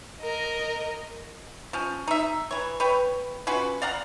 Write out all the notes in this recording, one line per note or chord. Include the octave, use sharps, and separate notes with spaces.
A#4 D#5
F3 C#4
D#4 E5
E3 C#5
B4 C#5 G5
C#4 F4 F#4 B4
D5 F5 F#5 A#5